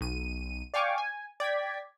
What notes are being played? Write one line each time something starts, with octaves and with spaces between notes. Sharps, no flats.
B1 D#7
D5 F5 G5 G#5 C#6 D6
G#5
D5 G5 G#6 B6